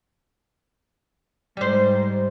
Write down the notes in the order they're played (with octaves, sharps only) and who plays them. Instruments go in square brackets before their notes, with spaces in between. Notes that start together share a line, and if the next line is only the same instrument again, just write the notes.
[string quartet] G#2 [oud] G3 C5